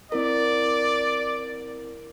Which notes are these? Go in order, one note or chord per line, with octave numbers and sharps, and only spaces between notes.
C4 E4 A#4 D5